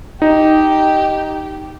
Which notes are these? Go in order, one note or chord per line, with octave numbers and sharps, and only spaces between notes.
D#4 G4